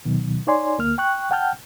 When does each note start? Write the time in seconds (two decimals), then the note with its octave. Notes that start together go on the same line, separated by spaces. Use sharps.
0.05 D2 B2 D#3 F#3
0.47 D#4 C#5 D5 G#5 C6
0.78 D2 A#3 F6
0.98 G5 C#6 F#6
1.31 F#5 G5 A5 F6 G6